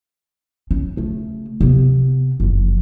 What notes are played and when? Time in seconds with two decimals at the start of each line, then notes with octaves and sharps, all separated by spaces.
0.71 C#4
0.97 C#3 A3
1.61 C3 B3
2.40 F#1 F3